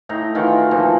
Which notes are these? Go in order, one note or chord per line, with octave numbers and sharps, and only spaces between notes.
A2 D#4 A#5
D#3 E3 F4 F#4
A#2 E3 F3 A4